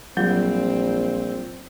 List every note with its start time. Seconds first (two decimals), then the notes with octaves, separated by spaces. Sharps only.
0.17 A#1 F#3 G3 C4 F4 G6